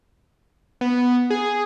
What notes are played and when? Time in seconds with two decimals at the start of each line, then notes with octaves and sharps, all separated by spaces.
0.81 B3
1.30 G#4